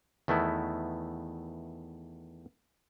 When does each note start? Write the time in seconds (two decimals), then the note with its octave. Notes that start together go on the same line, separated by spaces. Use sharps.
0.28 E2 D#3 A3 B3 E4